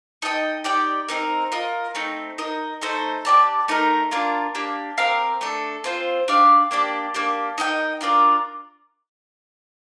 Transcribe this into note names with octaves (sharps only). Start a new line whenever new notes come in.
D#4 A4 D#5 G5
D#4 G4 D5 G5
C4 D#4 A#4
F4 A#4 D#5
A3 C4 D#4
D#4 A#4 D#5
A3 D#4 A4 C5
D4 G4 D5 A5
A3 D#4 A#4
A#3 D4 F4 A#4
A#3 D4 G4
C4 G4 A#4 F5
A3 D4 A4
C4 F4 C5
D4 G4 D5 F5
A#3 D4 G4 D5
A#3 D4 G4
D#4 A#4 D#5 G5
D4 F4 A#4 D5